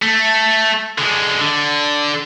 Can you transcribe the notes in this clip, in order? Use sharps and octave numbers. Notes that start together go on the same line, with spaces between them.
A3
D3 G#3
D3